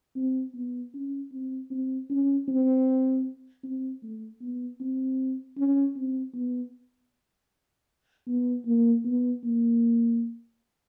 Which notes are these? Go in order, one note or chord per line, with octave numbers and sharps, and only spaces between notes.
C4
B3
C#4
C4
C4
C#4
C4
C4
A3
B3
C4
C#4
C4
B3
B3
A#3
B3
A#3